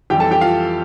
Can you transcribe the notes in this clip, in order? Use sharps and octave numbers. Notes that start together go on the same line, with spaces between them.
F2 E3 G3 G4 G5
A4 A5
G4 G5
F4 F5